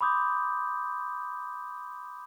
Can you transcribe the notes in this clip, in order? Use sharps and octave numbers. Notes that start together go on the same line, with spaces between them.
B5 C6 D6 D#6 G6